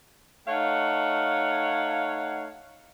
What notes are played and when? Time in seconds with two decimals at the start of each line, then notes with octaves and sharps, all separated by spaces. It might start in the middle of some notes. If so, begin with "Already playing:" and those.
0.48 A3 D#4 C#5 F5 F#5